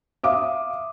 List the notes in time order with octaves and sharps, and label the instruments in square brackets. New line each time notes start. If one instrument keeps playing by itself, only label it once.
[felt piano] E5 F5 D6 D#6